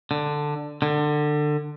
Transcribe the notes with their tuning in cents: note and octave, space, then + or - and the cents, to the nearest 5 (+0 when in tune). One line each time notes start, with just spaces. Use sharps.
D3 +10
D3 +25